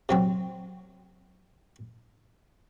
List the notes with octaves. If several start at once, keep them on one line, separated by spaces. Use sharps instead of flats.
C3 F#3 C4